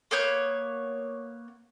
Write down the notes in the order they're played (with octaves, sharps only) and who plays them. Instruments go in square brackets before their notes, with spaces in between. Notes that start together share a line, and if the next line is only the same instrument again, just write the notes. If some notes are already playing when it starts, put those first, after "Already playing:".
[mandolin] A#3 B3 C#5 G6